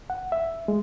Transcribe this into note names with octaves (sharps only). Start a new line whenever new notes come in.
F#5
E5
G#3